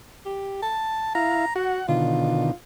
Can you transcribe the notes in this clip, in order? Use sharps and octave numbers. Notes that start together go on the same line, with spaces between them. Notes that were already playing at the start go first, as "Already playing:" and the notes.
G4
A5
E4 F5 A#5
F#4 F#5
B2 D3 D#3 F4